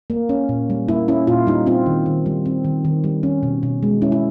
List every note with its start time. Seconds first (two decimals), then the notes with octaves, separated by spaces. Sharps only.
0.10 A#3
0.29 C#4
0.49 A#2
0.70 G3
0.88 A#3 E4
1.08 C#4 E4
1.27 A#2 F4
1.47 G3 D#4
1.67 C4 F4
1.86 D#3
2.06 D#3
2.26 G3
2.46 C4
2.65 D#3
2.85 D#3
3.04 G3
3.23 C#4
3.43 B2
3.63 B2
3.83 G#3
4.02 C#4 E4
4.12 E4